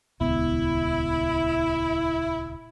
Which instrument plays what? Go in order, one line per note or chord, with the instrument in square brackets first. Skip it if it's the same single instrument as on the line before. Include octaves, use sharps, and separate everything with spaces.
[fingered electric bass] D#1 C#2 B3 [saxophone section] E4